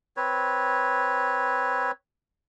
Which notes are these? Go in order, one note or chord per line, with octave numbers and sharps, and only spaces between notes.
C4 B4 C#5